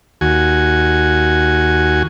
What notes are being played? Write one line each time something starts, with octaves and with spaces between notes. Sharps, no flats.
D#2 F#4 G#5